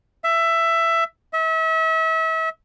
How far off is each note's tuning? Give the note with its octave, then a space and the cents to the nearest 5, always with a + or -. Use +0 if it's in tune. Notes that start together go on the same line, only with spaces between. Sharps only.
E5 +15
E5 -35